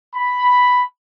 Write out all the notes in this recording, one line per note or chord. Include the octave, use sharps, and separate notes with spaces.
B5